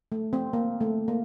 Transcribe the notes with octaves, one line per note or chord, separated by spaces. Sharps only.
A3
C4
A#3
A3
A#3